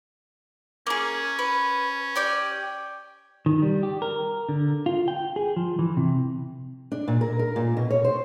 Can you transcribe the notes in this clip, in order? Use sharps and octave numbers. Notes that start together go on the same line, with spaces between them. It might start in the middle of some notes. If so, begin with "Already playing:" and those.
A#3 C#4 G#4
B4
G4 D5 G5
D#3
G3
G4
A#4
D3
F4
G5
G#4
F3
E3
C3
D4
A#2
A#4
A#4
A#2
B2
C#5
C5